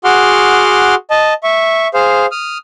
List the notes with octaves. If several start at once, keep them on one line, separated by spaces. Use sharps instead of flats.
F#4 G#4 F#5 C6 D6 F6
D#5 A5
E5 C#6
G#4 C5 F5
D#6 F6